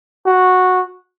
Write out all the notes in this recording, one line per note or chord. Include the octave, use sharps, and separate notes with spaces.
F#4